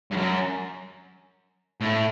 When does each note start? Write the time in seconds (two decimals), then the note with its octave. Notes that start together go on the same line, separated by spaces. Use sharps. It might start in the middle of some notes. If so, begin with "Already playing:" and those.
0.11 G2
0.16 F#2
1.81 A2